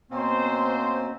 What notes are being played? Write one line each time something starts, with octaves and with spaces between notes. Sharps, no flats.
B2 A#3 C4 C#4 C5